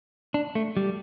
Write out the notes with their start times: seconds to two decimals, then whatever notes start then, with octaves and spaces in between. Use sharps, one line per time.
0.34 D4
0.55 A3
0.77 G3